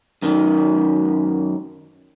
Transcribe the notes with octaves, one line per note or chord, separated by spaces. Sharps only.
F#2 D#3